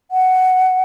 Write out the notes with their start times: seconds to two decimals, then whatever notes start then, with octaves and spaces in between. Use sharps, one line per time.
0.11 F#5